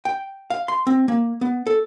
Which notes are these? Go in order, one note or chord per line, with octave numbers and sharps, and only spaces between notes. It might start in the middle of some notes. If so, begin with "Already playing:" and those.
G5
F5
C6
C4
A#3
B3
A4